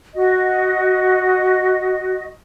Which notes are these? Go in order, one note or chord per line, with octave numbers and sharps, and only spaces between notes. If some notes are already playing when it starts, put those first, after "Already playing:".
F#4 D#5